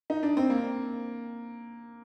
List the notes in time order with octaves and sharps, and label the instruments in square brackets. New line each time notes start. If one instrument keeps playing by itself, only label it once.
[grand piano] D#4
D4
C4
A#3